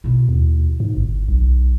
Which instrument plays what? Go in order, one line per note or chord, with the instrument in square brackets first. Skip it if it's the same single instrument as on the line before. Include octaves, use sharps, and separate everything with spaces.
[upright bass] B2 E4
[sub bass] D#2
G#2
G1
B1